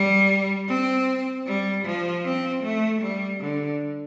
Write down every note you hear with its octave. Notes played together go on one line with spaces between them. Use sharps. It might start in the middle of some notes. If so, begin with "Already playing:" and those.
Already playing: G3
C4
G3
F3
C4
A3
G3
D3